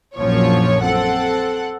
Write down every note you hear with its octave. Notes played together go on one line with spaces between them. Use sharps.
A#1 F#2 A#2 F3 C#5
C4 A4 F#5